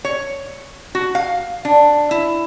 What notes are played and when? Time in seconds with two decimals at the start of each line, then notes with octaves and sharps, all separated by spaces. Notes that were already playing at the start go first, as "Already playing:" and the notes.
0.05 C#5
0.95 F#4
1.15 F5
1.65 D4
2.11 E4